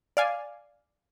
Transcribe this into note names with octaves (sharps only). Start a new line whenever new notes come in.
D5 F5 G#5